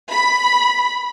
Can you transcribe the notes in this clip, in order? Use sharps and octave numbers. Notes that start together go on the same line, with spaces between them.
B5